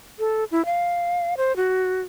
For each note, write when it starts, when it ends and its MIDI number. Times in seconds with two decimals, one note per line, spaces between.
0.19 0.44 69
0.51 0.65 64
0.65 1.37 77
1.37 1.55 72
1.56 2.01 66